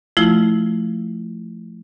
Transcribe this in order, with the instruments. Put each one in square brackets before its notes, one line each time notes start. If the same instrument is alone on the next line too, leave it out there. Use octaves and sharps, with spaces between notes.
[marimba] F3 A3 E4 F4